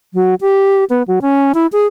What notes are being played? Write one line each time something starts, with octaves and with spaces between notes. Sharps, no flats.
F#3
G4
B3
F#3
C#4
E4
G#4